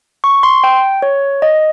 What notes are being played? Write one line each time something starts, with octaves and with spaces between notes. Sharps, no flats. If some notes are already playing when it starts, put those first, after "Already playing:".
C#6
C6
G5
C#5
D#5